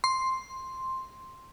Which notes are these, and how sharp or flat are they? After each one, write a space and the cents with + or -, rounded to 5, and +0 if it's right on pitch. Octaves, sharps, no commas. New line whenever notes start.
C6 +5